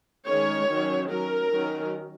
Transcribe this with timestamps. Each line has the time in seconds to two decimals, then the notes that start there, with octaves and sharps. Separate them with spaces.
0.27 D#3 G#3 C#4 C#5
0.69 D#3 F#3 C#4
1.10 F#3 C#4 A#4
1.52 D#3 F#3 C#4